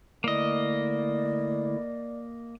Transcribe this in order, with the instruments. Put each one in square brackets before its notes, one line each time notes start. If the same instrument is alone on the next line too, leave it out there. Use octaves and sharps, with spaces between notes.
[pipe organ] D3 A3 E4 [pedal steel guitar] A#3 D#5 [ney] D5